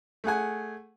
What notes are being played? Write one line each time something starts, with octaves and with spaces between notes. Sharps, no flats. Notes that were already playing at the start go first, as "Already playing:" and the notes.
A3 G#4 F#5 G#5